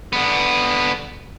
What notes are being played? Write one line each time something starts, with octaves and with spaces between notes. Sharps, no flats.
D3 B3